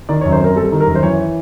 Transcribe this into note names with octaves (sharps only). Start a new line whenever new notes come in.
D#3 D5
C#5
F#2
C5
C4 A#4
G3 A4
D#3
A#4
F#2
C5
E3 C#5